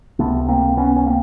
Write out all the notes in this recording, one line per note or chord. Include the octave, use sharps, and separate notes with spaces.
C#2 C3 A3 B3
A#3 C4
B3 C#4
C#4
A#3 C4